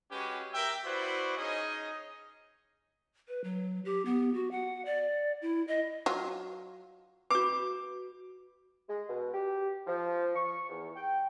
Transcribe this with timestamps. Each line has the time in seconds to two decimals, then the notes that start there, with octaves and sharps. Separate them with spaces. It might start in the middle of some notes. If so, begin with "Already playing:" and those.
0.11 G#3 C#4 F#4 G4 B4
0.54 G4 A#4 E5 G5
0.85 E4 F#4 B4 C5 D5
1.38 C#4 D#4 G#4 D#5
3.28 B4
3.44 F#3
3.85 G4
4.05 B3
4.34 F#4
4.51 F#5
4.86 D5
5.42 E4
5.68 D#5
6.06 F#3 F4
7.30 F#4 B4 D6
8.88 G#3
9.09 B2
9.34 G4
9.87 F3
10.36 C#6
10.70 E2
10.96 G5